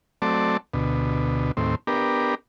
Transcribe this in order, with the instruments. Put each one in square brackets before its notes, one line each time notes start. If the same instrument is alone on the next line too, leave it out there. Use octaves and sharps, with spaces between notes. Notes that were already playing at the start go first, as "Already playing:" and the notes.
[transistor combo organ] F#3 A3 C4 D5 A5
D2 B2
D#2 A2 C4
B3 D4 G4 A#4